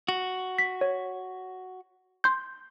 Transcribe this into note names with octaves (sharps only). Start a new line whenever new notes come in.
F#4
B6
C#5
C6 G6